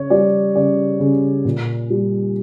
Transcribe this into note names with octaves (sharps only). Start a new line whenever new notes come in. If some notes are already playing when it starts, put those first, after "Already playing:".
Already playing: C#3 C#5
G3 D5
C#3 D5
C#3
A#2
G3